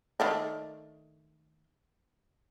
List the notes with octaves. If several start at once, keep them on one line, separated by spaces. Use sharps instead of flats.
D#3 A3 D4